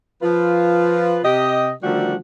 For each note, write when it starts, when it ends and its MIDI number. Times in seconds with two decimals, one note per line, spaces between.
0.22 1.19 53
0.22 1.19 65
0.22 1.19 71
1.25 1.71 48
1.25 1.71 67
1.25 1.71 75
1.83 2.16 50
1.83 2.16 51
1.83 2.16 53
1.83 2.16 55
1.83 2.16 57
1.83 2.16 66